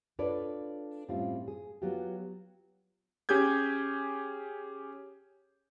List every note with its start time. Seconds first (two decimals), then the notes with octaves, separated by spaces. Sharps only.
0.19 D4 F4 A4 B4 C#5 D5
1.09 A2 G3 C4 C#4 F4
1.48 G#4
1.82 F#3 B3 F4 G4
3.29 C#4 G4 G#4 G6 G#6